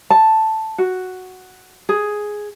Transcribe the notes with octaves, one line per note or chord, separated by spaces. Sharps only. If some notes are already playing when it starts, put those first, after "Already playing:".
A5
F#4
G#4